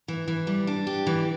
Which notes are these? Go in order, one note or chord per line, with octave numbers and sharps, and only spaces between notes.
E3
E3
G3
D4
G4
E3